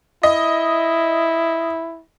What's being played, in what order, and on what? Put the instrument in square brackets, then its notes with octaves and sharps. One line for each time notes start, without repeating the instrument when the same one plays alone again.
[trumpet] E4 [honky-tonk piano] D#5